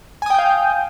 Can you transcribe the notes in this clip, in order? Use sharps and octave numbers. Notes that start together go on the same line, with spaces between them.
F5 G5 G#5 D#6 G6